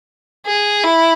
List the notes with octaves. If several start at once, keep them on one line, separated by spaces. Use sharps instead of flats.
G#4
E4